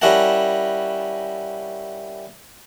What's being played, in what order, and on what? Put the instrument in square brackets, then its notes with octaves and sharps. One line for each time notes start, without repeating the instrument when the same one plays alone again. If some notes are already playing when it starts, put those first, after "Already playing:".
[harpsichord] G3 C#4 E4 A#4 F#5 A5